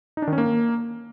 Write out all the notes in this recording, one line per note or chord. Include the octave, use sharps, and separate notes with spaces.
D#4
D4
D#3
C#4
A#3